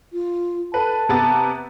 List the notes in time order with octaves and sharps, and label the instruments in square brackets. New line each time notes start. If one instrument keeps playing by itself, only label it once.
[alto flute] F4
[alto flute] A4 [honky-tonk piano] B4 [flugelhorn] A5
[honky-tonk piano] C3 B3 A6 [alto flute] A#5